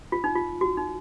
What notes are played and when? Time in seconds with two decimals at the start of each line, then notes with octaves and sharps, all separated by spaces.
0.12 F4
0.24 D#4
0.36 F4
0.61 F#4
0.77 D#4